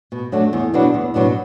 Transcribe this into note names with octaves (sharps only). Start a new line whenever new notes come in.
B2
F#3 A3 D4
E2
B2 F#3 B3 D4
E2
B2 F#3 B3 D4